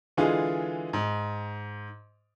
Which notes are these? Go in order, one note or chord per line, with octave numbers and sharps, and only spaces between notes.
D3 E3 G#3 F4 G#4
G#2